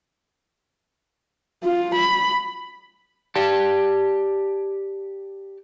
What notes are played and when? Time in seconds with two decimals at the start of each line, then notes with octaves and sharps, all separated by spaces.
1.64 F4
1.95 B5
3.35 G4 D5 A5